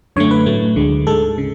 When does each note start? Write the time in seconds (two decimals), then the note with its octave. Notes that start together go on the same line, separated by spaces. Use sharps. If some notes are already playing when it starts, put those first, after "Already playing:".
0.16 F#2 D3 A3 C#5
0.31 B4
0.46 A2 F#3 A3
0.76 D2 D3 G#3
1.07 G#2 G#3 A4
1.38 C#3